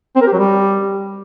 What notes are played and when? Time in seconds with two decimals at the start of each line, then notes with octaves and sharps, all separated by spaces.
0.15 C4
0.21 A#4
0.27 G4
0.33 F#3
0.38 G3